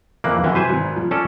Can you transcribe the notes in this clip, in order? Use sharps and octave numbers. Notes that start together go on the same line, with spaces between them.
F2 E3 A#3 F#6
F#2 E3 G5 G#5
C3 F#3 E4 B4 C5 G#5
G#1
F3
C#4 A4 D5